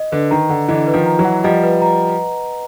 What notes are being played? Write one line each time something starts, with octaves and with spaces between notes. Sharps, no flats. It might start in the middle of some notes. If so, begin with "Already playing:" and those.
Already playing: D#5
D3 B4
D#3 A#5
D3 F#5
D3 E3 D#5
B4
D#3 F3
A#5
E3 F#3
F#5
F3 G3 D#5
B4
A#5